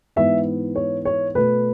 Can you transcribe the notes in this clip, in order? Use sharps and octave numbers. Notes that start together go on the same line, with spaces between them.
G#2 E3 B3 E5
C#5
C#5
B2 A3 B4